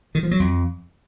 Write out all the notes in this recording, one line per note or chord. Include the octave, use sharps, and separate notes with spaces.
D#3
F3
F#3
F2